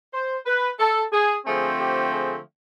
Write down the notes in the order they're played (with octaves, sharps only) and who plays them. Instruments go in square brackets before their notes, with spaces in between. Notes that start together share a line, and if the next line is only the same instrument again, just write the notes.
[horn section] C5
B4
A4
G#4
D3 F3 A3 C4 G#4
G4
G#4